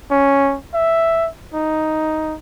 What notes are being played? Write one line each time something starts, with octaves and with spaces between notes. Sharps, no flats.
C#4
E5
D#4